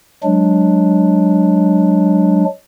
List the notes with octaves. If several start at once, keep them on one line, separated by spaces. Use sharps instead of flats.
F#3 G#3 D4